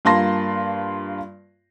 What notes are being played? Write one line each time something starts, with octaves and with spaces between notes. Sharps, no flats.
G2 A#3 F4 A5 C6 A#6